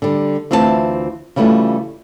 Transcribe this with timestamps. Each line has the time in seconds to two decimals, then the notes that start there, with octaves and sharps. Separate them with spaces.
0.02 D3 G3
0.51 D2 E3 C4 F4 C#5 A5
1.36 C#3 E3 G3 A3 F4 F#4